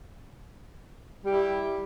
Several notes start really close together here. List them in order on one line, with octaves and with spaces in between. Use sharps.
G3 G4 E4